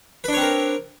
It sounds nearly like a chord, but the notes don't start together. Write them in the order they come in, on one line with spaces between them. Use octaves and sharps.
B4 D4 C#5 C4 A#4